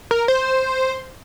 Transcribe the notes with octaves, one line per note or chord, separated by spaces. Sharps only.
A#4
C5